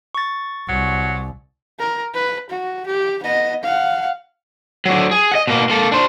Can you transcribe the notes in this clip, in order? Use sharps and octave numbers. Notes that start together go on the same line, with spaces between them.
C#6 A6
C2 F#3
A#4
B4
F#4
G4
B3 D#5
F5 F#5
D3 F#3
G#4
D#5 F#5
B2 A#3
A#3 A4
D4 C5